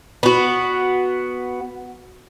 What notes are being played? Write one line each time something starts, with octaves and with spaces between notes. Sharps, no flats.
B3 F#4